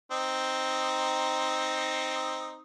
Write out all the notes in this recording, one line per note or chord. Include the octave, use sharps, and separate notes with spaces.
C4 D#4